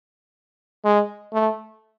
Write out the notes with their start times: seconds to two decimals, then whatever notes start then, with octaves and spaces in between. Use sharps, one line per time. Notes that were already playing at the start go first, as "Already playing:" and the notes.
0.85 G#3
1.33 A3